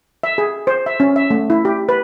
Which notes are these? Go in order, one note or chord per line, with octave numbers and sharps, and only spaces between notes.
E5
G#4
C5
E5
C#4
E5
A3
E4
G4
B4